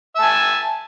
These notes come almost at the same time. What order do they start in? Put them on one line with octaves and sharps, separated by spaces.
E5 A5 G#5